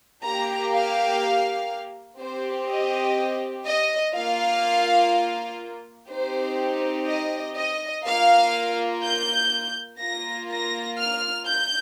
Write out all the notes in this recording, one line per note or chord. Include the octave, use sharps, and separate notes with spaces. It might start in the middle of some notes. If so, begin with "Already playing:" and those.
A#3 G4 A#5
F5
C4 G4 C5
D#5
D#5
A#3 F4 F5
C4 D#4 G4 C5
D#5
D#5
A#3 F4 F5
G6
A#3 F4 A#6
A#6
F6
G6